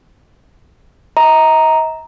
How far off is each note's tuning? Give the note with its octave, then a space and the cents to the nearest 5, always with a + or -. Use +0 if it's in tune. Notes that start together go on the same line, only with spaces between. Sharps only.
D#5 +40 A#5 +0